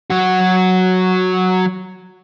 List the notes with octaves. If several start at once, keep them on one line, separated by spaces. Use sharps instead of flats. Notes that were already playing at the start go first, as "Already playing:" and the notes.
F#3 F#4